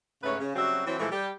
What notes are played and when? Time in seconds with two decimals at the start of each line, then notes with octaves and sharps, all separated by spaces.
0.23 G#2 C#3 A3 B4 C#5
0.39 C#3
0.55 C#3 F#3 G3 C4 F#4 E5
0.86 E3 F#3 C4
0.99 A#2 E3 F3 G#3 A3
1.12 G3 G4